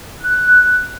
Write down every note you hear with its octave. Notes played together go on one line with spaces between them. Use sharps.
F#6